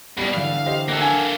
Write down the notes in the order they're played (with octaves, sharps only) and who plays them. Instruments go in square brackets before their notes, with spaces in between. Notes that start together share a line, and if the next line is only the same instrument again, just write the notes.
[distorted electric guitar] B2 [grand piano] G3 [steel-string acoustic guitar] B3 D5
[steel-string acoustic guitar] D3 E3 B4 [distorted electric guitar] F5
[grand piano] G4 C5 D#5
[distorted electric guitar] A#3 A4 [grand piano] G5 F#6 A#6
[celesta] D4 F#5 G#5 [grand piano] G#6